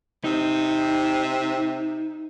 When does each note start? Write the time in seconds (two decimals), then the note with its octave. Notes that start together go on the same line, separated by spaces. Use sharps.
0.24 C3 D#4